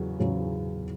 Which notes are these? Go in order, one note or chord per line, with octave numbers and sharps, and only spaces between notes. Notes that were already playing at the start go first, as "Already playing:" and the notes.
Already playing: E2 C#3 F#3
E2 C#3 F#3